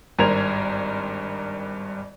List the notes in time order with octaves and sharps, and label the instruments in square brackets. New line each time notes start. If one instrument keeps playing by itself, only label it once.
[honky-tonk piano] G#1 G2 A#4 C5 G#6 F7